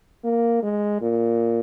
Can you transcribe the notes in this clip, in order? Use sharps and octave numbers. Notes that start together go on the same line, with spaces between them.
A#3
G#3
A#2